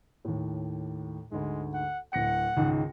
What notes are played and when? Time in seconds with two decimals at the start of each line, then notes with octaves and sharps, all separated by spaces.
0.25 D#2 A2
1.31 D2 G#2 G#3
1.74 F#5
2.13 D1 F#5 A#6 C#7
2.57 C#2 G#2 D#3